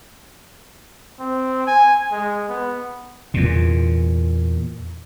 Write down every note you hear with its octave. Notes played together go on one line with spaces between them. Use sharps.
C4
G#5
G#3
B3
E2 A#2